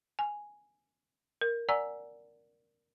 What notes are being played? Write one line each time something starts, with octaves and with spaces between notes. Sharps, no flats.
G#5
A#4
D5 F#5 G#5 A#5 E6